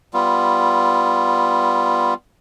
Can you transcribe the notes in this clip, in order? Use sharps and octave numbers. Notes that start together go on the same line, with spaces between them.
G3 B3 F4